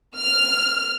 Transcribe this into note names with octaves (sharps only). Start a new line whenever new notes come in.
F6